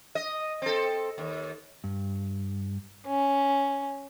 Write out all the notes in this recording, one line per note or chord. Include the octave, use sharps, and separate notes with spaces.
D#5
C4 A4
D#2
G2
C#4